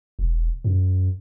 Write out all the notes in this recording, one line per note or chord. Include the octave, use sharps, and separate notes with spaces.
E1
F#2